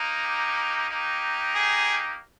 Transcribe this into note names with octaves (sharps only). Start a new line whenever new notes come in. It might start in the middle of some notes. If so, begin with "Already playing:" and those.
Already playing: A#3 D#4
G4
A#3 D#4 G4
G#4